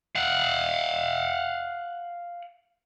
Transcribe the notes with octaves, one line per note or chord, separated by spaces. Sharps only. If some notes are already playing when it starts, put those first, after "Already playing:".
F5 F#5